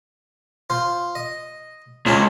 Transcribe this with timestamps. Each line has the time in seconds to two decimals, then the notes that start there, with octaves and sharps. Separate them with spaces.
0.70 F4 C5
1.15 D#5
2.06 C#2 C4 C#4 C#5